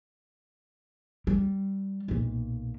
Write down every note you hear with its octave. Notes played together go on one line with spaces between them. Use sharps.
G3
B1 A#2